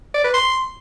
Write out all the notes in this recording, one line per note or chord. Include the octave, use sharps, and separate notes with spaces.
D5
B4
C6